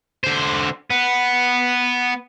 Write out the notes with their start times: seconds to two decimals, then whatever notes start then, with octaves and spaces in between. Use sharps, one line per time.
0.24 D3 C5
0.90 B3